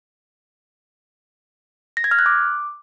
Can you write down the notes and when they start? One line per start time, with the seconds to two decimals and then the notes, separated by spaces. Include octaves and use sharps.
1.97 A#6
2.04 G#6
2.11 F6
2.19 F#6
2.26 D6